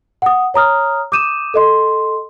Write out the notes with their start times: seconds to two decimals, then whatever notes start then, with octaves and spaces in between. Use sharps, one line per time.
0.22 F#5 D#6
0.54 C#5 A#5 D#6 F6
1.12 D6 D#6 G6 D#7 E7
1.54 A4 D#5 C6